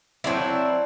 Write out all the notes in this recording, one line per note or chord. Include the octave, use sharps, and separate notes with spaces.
F#3 C4 E4 D5 A5 G6